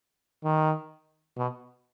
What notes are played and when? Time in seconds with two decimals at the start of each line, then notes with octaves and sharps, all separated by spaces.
0.44 D#3
1.37 B2